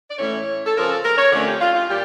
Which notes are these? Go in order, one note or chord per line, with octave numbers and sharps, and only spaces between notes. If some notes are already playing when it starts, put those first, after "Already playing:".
D5
A2 E3 A3 C#4 C#5
A4
C#3 F3 C#4 A#4
A4
A#4
C#5
F2 D3 A3 C#4 A#4
G4
F4
F4
A#2 G3 G4